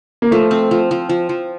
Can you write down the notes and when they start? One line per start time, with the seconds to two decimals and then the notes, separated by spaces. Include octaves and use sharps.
0.22 A#3
0.31 F3 A3
0.51 C4
0.71 F3
0.91 F3
1.09 F3
1.29 F3